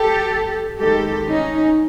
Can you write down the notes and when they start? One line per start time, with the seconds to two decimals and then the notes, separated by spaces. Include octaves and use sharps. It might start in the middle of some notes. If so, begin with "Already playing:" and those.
Already playing: G4 A4
0.78 D#2 D#3 G#3 G4 A4
1.26 C#4 D#4